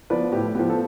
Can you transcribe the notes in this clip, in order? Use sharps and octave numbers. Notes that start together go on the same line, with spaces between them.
F3 B3 B4 D5
A2 G4
F3 B3 G4
A4